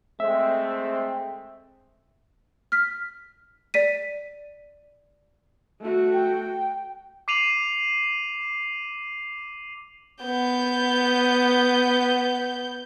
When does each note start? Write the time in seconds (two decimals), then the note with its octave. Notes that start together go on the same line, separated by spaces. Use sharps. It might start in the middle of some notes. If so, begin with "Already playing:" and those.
0.20 G#3 A3 C4 E5
2.72 F6 B6
3.74 D5 B6 D#7
5.81 A3 F#4
6.13 G5
7.28 D6 C7 D#7 F7 F#7
10.24 B3 G6